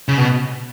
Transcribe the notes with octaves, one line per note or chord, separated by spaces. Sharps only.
C#3
B2